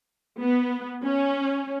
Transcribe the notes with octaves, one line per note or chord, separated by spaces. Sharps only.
B3
C#4